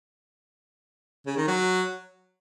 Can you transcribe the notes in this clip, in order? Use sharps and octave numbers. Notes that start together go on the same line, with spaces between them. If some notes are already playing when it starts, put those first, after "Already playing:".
C#3
D#3
F#3